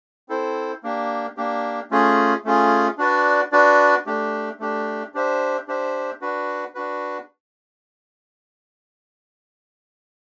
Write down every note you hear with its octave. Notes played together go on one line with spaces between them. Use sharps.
C4 E4 A4 C5
A#3 D4 G4
A#3 D4 G4
A3 C#4 F4 G#4
A3 C#4 F4 G#4
D4 F#4 B4 D5
D4 F#4 B4 D5
A3 D4 G4
A3 D4 G4
D4 G4 C5 E5
D4 G4 C5 E5
D4 F#4 B4
D4 F#4 B4